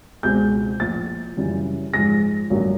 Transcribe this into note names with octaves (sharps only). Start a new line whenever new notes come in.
C#2 B2 G#3 C4 G6
A#1 A2 F3 A6
F#2 C#3 E3 G3
G#2 F3 G#3 A#6
A1 G2 D3 F#3 A#3